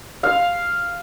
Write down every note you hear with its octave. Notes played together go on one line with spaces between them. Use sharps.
F5